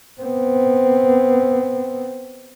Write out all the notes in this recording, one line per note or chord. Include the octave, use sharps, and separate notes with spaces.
B3 C4